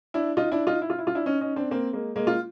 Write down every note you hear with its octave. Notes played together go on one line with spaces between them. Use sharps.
D4 E4
D#4 F4
D4 E4
D#4 F4
E4
F4
E4
F4
D4 E4
C#4 D#4
C#4 D#4
C4 D4
A#3 C4
G#3 A#3
G#3 A#3
F4